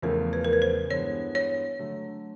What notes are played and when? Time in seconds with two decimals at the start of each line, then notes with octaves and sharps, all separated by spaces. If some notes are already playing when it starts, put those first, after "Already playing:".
0.02 E2 C#3 F3 A3 A#4
0.33 B4
0.44 A#4
0.53 B4
0.62 C5
0.91 G2 E3 G#3 B3 C#5
1.35 C#5
1.79 D3 F#3 A3